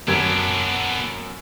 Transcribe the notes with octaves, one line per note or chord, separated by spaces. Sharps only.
F#2 B3 D4 G#6